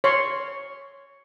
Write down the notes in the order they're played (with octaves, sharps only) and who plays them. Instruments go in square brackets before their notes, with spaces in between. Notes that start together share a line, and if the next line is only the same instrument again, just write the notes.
[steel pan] C#5 C6